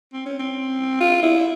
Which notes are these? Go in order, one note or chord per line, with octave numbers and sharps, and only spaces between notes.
C4
C#4
C4
F4
E4